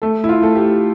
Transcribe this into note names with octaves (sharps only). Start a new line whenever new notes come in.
A3 A4
E4
F4
A3 A4
G4